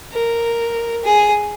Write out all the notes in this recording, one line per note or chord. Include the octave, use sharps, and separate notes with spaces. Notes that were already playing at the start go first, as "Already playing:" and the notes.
A#4
G#4